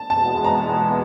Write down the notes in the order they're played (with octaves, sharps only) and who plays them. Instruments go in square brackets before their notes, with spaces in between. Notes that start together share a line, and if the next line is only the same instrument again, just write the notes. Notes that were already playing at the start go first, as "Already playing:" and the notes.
Already playing: [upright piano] A5
[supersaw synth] E2 B2 G#3 B3 [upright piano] A5
[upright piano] A#5